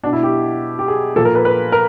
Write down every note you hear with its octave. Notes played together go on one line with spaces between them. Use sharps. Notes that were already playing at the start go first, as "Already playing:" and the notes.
B2 D4
E4
G4
G4
G#4
A#2 F3 A4
A#4
B4
B4
A#4